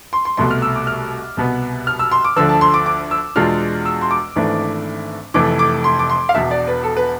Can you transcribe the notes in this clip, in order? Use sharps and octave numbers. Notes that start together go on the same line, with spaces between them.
C6
C6
C2 B2 A3 C6
F6
E6
D6
F6
C2 B2 B3
F6
E6
C6
D6
D2 D3 F3 E6
A5
C6
D6
D6
E6
E2 B2 G#3 D4 F4 F6
E6
C6
D6
G#1 G#2 E3 A3 D4
F1 F2 E3 A3 D6
D6
C6
D6
C6
F5
E1 E2 B2 E5
D5
B4
A4
B4